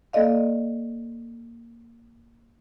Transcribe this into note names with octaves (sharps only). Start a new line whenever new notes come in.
A#3 A4 D5 D#5 F5